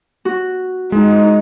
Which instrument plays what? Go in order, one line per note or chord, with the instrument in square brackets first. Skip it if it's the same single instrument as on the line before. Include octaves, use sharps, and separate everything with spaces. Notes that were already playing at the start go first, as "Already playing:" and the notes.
[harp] F#4
[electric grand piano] G#3 [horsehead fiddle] D#4